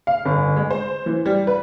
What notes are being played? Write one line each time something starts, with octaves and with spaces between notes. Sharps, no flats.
F5
G1
G#3
C5
E3
G3
B4